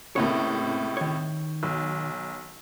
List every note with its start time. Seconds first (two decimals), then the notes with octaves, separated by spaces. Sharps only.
0.16 C#2 A2 C3 A3 A#3 C#5
0.97 D#3 C#5
1.63 B1